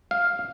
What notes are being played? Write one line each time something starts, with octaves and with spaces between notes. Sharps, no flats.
F5